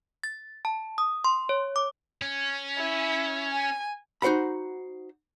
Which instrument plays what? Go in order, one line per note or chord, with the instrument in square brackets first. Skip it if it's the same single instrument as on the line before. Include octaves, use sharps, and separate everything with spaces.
[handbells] A6
A5
D#6
C6
C#5
D6
[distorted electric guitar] C#4
[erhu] E4
G#5
[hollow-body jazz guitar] D#4 F#4 C5 F#5 B5